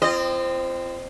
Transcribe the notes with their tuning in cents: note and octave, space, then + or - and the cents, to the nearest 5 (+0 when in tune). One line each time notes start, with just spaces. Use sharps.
C4 +0 F4 -35 D#5 -35